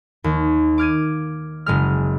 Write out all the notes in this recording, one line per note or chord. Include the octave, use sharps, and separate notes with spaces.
D#2
D6 F6 G#6 D#7
F#1 G#3 F6